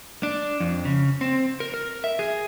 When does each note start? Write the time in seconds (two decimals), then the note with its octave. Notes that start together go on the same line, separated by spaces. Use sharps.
0.23 D4
0.60 F2
0.85 C#3
1.21 C4
1.60 A#4
1.74 A#4
2.04 E5
2.19 G#4